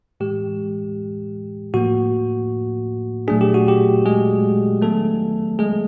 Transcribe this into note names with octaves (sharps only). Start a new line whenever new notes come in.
A2 E3 G#3 G4
A2 F3 A#3 F#4
A#2 F#3 A3 D4 G#4
G4
F#4
G4
G#3 G#4
D#3 F#3 A3 B3 D4 A4
G#3 G#4